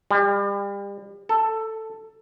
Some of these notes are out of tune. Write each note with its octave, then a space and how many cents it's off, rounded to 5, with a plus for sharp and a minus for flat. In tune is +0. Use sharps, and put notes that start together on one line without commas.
G3 +35
A4 +10